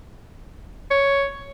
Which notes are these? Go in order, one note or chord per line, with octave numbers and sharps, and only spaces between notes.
C#5